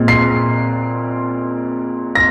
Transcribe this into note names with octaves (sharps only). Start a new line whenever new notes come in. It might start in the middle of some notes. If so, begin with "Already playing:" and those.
Already playing: A#2 G#3 C4
C7
A#6